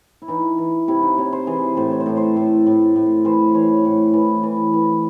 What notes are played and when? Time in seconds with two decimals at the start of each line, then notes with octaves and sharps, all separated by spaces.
0.22 E4
0.28 E3 D#4
0.58 E3
0.88 C3 E4
1.03 D#4
1.18 C3 C#5
1.33 C5
1.47 E3 G#4
1.76 A2 C5
1.91 C#5
2.00 C5
2.06 A2 A4
2.17 C5
2.36 A2
2.66 A2
2.96 A2
3.25 E3 C5
3.54 E3 C#5
3.85 A2
4.13 E3
4.43 E3
4.74 E3